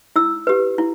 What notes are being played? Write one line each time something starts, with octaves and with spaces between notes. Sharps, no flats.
E4 E6
G4 B4
E4